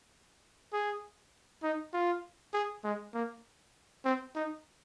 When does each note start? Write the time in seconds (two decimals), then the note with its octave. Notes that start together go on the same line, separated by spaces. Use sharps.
0.73 G#4
1.63 D#4
1.93 F4
2.54 G#4
2.84 G#3
3.14 A#3
4.05 C4
4.35 D#4